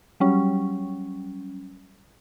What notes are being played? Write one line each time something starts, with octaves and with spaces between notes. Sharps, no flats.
F#3 G3 C#4